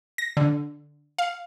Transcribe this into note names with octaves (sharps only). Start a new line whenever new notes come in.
A#6
D3
F5